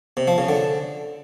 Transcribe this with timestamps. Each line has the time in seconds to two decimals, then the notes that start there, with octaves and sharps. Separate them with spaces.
0.17 C3
0.27 F3
0.38 C#3
0.49 D3